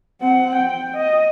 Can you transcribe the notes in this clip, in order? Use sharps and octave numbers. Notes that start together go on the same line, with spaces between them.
C4 F#5
G5
D#5